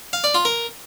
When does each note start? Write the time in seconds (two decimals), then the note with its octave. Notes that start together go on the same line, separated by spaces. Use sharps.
0.13 F5
0.24 D5
0.35 F4
0.45 A#4